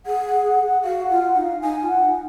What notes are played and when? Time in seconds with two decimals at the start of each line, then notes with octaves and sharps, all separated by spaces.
0.05 G#4 F#5
0.25 F#5
0.45 F#5
0.64 F#5
0.84 F#4 F5
1.03 F#5
1.10 F4
1.23 F#5
1.36 D#4
1.43 F5
1.62 D#4 G#5
1.82 F4
1.88 F#5
2.01 D#4